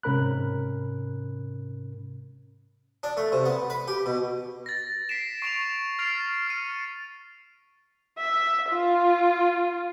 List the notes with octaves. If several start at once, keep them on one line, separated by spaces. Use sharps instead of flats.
G#2 C3 C#4 A#4 B5 F#6
D4
A3
C3
B3
B4
G4
B2
A6 A#6
B6 C7 D7 E7
C#6 D7 E7 F7
F6 A6 C7 D7 F7
F6 C#7 D#7
E5
F4